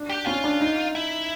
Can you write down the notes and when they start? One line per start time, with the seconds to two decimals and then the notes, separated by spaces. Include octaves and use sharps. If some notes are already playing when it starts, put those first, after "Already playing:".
Already playing: D4
0.09 G4
0.26 C#4 F4
0.44 D4
0.61 D#4
0.95 E4